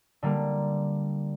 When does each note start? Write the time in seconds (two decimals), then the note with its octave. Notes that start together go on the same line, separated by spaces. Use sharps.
0.22 D3 G3 A#3